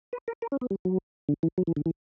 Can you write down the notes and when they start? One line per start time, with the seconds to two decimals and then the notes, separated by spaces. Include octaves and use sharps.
0.13 B4
0.28 A#4
0.42 A#4
0.52 C#4
0.61 B3
0.70 G3
0.85 F#3
1.29 D3
1.43 E3
1.58 F#3
1.67 E3
1.76 D3
1.86 E3